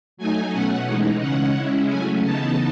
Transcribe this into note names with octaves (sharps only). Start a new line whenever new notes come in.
F#3 A3 D#4 G#5
B2 A3 C#4 F#5
E3 G#3 D#4
C#3 G#3 C#4 F#5
C#3 G#3 C#4 E4
F#3 A3 C#4 G#5
C#3 E3 B3 D#4 A5